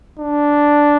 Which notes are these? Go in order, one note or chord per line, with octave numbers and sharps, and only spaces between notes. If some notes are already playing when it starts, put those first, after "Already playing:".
D4